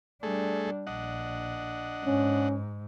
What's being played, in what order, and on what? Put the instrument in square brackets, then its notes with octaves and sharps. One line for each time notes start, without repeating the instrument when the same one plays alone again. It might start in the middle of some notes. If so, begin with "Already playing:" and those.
[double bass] G3 D4 [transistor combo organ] A3 G#4 A4
[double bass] A#1 [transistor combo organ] D4 D#5 F#5
[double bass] G#2 [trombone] C#4